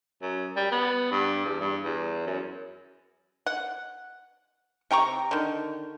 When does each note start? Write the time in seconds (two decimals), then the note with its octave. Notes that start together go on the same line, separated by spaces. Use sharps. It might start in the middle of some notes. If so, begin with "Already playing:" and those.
0.22 F#2
0.56 G3
0.71 B3
1.11 G2
1.45 E2
1.61 G2
1.84 E2
2.27 F#2
3.46 F#5
4.91 C3 G5 A#5 C#6
5.31 D3 D#3